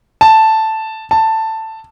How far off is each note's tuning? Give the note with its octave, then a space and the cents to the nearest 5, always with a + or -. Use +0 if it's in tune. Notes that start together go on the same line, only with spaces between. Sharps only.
A5 +0
A5 +10